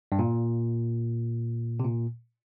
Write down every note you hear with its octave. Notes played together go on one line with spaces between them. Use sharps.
G2
A#2
C3
A#2